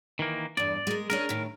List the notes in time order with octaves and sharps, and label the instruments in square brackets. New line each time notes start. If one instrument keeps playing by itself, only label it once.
[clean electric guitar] D#3 E3 A#3
[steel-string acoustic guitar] E2 G2 [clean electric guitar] D5
[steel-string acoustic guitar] G#3 A#4
[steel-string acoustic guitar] C#4 D4 G#4 [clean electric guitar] A#4
[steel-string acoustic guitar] A2 D#3